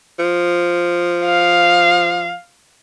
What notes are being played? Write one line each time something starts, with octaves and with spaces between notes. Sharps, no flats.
F3
F5